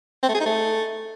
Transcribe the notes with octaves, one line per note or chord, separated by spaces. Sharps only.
C4
A3
G#4
D#4
A3